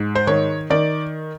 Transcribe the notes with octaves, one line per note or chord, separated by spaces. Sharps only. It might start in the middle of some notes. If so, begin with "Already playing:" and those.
Already playing: G#2
C5
D#3 C#5
D#3 D5